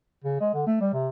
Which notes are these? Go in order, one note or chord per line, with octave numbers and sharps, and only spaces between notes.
C#3
G#3
D3
A3
G3
C3